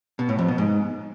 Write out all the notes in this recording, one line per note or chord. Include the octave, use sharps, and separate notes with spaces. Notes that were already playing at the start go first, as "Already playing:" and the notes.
B2
A2
F2
B2
G#2